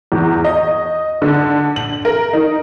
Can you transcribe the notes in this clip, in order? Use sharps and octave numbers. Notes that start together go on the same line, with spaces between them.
E2
D#5
D3
F#7
A#4
D#4